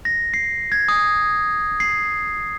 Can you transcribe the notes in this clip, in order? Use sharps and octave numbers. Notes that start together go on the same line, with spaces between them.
A#6
C7
G#6
D#6
C7